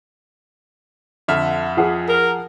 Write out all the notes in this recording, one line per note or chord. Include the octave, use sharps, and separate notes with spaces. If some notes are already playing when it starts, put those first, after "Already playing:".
F2 D3 E5 F6
F3 G#4 F#5
A#4